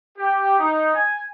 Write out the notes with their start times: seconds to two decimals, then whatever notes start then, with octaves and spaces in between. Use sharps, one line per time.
0.17 G4
0.59 D#4
0.94 G#5